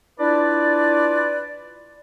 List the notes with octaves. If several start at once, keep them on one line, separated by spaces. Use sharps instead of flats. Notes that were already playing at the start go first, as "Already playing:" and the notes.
D4 E4 F4 B4 D5